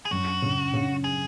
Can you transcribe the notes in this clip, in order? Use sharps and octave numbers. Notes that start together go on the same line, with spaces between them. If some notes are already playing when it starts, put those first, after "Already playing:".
G#4
F#2 F#4
C#3
C#3
G#4